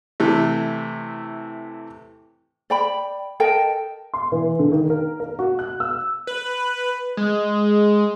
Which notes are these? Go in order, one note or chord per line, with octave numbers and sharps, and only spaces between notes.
C3 E3 A3
D5 G5 B5
A4 A#4 D#5 G5
C6
E3
D3
D#3
A#4
A#4
F#4
F#6
E6
B4
G#3